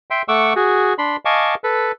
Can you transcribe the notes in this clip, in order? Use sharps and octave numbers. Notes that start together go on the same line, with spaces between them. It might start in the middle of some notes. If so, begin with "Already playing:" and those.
E5 G5 C6
A3 F#5 C#6 D6 E6
F#4 G#4
D4 B5 C6
D#5 F5 G#5 A5 C#6 D6
A4 B4